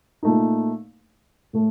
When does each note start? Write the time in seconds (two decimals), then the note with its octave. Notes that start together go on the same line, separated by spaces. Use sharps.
0.23 A#2 A3 D#4
1.53 A2 A3